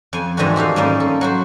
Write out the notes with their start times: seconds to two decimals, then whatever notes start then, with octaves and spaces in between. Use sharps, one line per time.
0.13 F2 G#5
0.37 G#2 D#3 E3 C4 D4 F#4
0.56 F#4 G4 A4 F5
0.76 G#2 G3 A#3 C#4 D#4
1.00 A4
1.21 F#3 F#4 C5